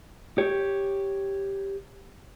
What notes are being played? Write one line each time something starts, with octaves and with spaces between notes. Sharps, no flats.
G4 C#5